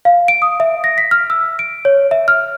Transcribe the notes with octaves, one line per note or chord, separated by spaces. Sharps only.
F5
D7
D#6
E5
A#6
B6
F6
E6
D7
C#5
E5
F6